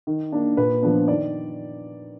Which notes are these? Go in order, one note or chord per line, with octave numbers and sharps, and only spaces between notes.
D#3
A#3 D4
A#2 B4
F3 B3 D4
D#3 D5